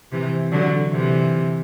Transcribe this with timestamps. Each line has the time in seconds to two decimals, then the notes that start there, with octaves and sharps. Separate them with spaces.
0.12 C3 E3
0.52 D3 F#3
0.91 C3 E3